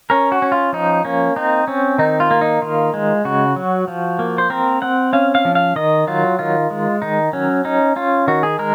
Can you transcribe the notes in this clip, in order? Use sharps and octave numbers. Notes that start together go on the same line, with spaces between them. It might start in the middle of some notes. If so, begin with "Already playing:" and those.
C#4 A#4
F#4
C#4
F4
F3 D#4
A#3 C#4
C4 D#4
C4 C#4
D#3 D#4
F4
A#3
D#4
D#3 F4
G#3
C#3 F#4
F#3
F3
A#3
C5
C4 A#4
C4 F#5
C#4 F5
F5
F3
F5
D#3 D#5
F#3 F4
D#3 F4
G#3
D#3 D#4
F#3 C#4
C#4 D#4
C#4 F4
D#3 F#4
G#4
G#3 A#4